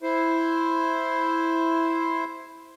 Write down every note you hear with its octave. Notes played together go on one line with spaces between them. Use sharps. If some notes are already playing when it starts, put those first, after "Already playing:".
E4 C5